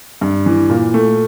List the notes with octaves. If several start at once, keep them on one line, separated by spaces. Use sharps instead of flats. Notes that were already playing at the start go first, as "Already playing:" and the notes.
G2
E3
A#2
A3